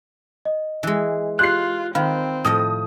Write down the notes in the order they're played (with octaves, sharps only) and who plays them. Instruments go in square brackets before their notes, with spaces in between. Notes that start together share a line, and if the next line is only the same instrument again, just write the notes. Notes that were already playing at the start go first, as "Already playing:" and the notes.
[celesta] D#5
[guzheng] E3 G#3
[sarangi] F4 [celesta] G4 C6 G6 [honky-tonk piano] F#6 C7
[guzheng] D#3 [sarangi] C4 [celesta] F5 B5 F6
[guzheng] A2 F3 D#5 [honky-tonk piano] D#6